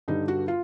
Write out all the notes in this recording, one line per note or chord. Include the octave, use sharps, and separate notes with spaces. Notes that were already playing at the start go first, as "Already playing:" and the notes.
G2 D3 G3 D#4
F#4
F4